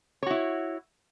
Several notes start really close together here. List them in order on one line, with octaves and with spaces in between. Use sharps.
C#5 F#4 E4